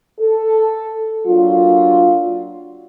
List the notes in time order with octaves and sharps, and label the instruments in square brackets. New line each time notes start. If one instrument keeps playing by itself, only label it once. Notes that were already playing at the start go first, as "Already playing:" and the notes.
[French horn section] A4
F#3 A#3 D4 F4